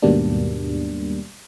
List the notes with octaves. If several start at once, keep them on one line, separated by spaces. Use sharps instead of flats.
D#2 G#2 B2 G3 A#3 D4